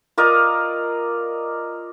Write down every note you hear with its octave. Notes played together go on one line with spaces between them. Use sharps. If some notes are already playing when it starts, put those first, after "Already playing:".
F4 A#4 D5 D#5